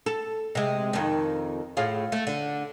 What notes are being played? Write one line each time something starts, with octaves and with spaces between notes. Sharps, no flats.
A4
C3 G#3
F2 D#3
A2 F4 G#4
A3
D3